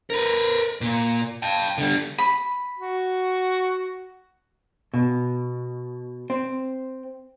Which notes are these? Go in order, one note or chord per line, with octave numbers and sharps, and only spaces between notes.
A#4 B4
A#2
G5 A5
D3 G3
B5
F#4
B2
C4